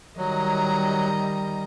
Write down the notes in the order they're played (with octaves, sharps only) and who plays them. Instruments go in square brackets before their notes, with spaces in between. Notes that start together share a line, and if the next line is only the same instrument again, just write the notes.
[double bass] D#3 G3 [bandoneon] F#3 [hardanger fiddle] D#5 A#5